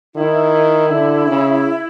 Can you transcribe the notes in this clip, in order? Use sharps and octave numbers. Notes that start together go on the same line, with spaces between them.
D#3 E4
D3
C#3